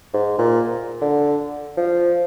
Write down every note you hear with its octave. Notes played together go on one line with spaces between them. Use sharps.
G#2
A#2
D3
F3